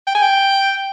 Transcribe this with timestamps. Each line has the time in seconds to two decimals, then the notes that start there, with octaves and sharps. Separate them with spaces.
0.07 G5
0.15 G#5
0.22 G5